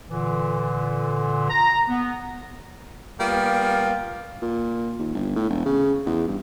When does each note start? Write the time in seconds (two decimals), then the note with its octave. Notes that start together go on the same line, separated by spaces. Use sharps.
0.09 A#2 D3 E3
1.50 A#5
1.89 B3
3.20 G3 A#3 B3 F4
4.42 A#2
4.99 D#2
5.14 G1
5.36 A2
5.50 E1
5.66 C#3
6.06 E2
6.28 G2